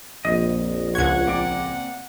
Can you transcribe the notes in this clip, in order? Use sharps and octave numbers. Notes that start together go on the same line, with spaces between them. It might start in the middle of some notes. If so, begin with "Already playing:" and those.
A#1 F2 D#5
C#2 F#4 F#5 G#6
A#3 C4 D5